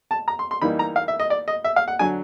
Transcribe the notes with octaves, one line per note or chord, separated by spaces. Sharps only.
A5
A#5
C6
C6
E3 G3 A#3 D#4 B5
A#5
F5
E5
D#5
D5
D#5
E5
F5
F#5
D3 F#3 G#5